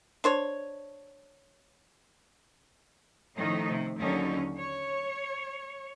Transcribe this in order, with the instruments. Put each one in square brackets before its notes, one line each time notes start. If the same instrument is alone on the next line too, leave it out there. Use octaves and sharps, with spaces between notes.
[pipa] D4 C5 C#5
[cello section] A2 D#3 F3 A3 C#4 D#4
C3
D#2 D3 F#3 C#4 D#4
C#5